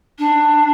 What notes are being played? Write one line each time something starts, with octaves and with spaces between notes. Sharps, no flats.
D4